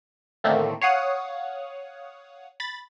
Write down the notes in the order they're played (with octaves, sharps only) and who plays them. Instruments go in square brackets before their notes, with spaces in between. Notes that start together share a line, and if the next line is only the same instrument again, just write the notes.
[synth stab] A2 D3 D#3 A3 A#3 C4
C#5 F5 F#5 D#6
B5 A6